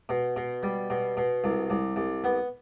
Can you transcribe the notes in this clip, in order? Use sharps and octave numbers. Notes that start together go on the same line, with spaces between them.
B2
B2
G3
B2
B2
C2
C2
C2
B3